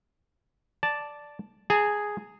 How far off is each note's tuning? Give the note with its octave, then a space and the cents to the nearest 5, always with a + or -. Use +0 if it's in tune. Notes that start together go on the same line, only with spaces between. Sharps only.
D5 +0 A5 +0
G#4 +0 A#5 -45